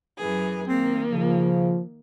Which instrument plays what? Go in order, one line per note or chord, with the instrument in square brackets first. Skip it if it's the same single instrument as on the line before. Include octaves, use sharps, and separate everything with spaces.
[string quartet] F#2 E3 G#4
[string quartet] D#3 A#3 [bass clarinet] C4
[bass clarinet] C#3 [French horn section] F3